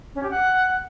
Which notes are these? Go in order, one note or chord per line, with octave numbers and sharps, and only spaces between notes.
C#4
G4
F#5